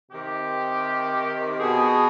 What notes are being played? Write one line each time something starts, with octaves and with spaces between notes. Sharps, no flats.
C3 D#3 G4
B2 G#4